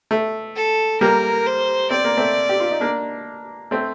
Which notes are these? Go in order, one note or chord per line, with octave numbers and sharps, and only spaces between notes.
A3
A4
G3 A#3 A#4
C5
C4 D5
A#3
A3 C4
G4
F4
D#4
A#3 D4
A3 C4